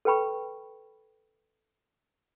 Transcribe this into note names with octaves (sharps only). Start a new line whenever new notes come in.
A4 B4 G5 B5 C#6